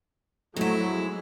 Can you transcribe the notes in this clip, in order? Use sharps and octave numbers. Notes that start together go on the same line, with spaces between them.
F2 F#3 A3 E4
G#3